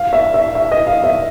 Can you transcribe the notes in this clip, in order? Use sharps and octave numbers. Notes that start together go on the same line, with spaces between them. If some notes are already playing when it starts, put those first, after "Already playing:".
Already playing: F5
E5
E5
E5
D#5
F5
E5